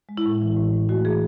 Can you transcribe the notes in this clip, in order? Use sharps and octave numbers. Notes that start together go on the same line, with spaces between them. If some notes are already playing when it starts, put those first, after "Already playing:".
G#3
E4
A2
E3
A2
A2
A3 F#4
E3 G#4